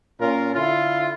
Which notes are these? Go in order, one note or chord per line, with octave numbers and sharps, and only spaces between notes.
A#2 C#4 F4 A#4
D3 E4 F4